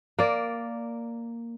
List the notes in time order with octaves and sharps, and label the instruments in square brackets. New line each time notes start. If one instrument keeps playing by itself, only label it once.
[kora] A#3 D5